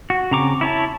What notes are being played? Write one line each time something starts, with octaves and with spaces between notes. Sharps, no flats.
F#4
C#3 C4 A#5 C#6 D6
E4 C#5 A5